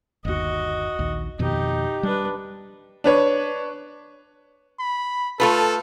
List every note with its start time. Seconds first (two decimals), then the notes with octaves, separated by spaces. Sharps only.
0.25 G1 D#2 F#4 D#5
0.99 A#1 D#2
1.39 F2 B2 D#3 D#4 G4
2.03 G3 D4 B4
3.04 D4 B4 C#5
4.80 B5
5.40 A3 F4 A4 B4